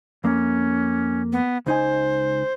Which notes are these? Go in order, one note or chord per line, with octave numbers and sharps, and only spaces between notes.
F2 A#3 C#4
B3
C#2 D#4 C5 G#5